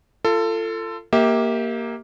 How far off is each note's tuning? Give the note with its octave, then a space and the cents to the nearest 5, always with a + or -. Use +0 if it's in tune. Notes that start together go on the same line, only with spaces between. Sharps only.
F4 -25 A4 +20
A#3 +0 G4 +0 E5 -35